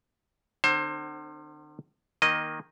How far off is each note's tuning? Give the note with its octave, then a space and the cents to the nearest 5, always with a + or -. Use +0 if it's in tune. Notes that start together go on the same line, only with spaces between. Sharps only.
D3 +45 C4 +0 C5 +30
D#3 +0 A#3 +15 D#5 -10